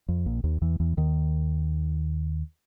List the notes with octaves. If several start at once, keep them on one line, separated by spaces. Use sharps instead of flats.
F2
A#1 A#2
D#2 D#3
E2 E3
E2 E3
D#2 D#3